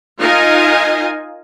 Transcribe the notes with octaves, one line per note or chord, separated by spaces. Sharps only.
D#4 F4 A#4 D#5 F5 G#5